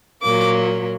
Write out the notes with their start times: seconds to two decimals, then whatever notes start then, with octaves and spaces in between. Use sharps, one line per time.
0.22 A#2 F#3 A#3 D6